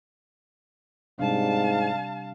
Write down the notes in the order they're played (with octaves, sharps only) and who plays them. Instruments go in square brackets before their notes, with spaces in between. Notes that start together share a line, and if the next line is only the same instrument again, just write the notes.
[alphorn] G#2 [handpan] C3 G3 D4 [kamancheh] F5 A5